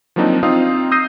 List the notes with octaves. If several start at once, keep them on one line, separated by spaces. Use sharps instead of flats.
F3 F#3 A#3 C4 D4 D#4
C4 D#4 F4 F5 D#6
D#6 E6 G6 A#6 C7 D#7